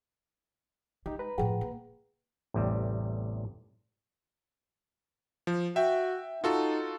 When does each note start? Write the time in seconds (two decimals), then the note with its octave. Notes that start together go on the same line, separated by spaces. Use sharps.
1.06 G#3 D#4 G4
1.19 B4 A#5
1.38 A2 F3 G#4 F#5 G5
1.61 A#3
2.54 A1 E2 C3 G3
5.47 F3
5.76 F#4 E5 G5
6.44 D#4 F4 F#4 A4